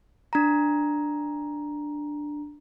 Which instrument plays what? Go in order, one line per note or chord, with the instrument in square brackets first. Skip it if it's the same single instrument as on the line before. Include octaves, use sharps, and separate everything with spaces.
[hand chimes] D4 A#5